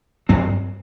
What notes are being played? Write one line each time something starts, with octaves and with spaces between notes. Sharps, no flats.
G2 F#3 C4